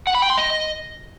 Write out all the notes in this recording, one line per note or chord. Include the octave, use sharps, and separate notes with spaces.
F#5
B5
G5
C6
D#5